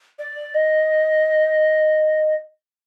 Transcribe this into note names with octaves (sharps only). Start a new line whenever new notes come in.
D5
D#5